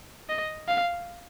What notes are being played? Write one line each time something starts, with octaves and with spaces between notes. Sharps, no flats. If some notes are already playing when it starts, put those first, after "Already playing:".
D#5
F5